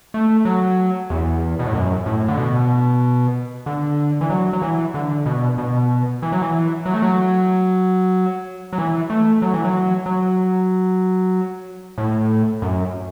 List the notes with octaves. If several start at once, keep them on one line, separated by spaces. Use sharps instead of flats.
A3
F#3
E2
B2
A2
F#2
A2
D3
B2
D3
E3
F#3
F#3
E3
D3
B2
B2
E3
F#3
E3
F#3
A3
F#3
F#3
E3
A3
F#3
E3
F#3
F#3
A2
F#2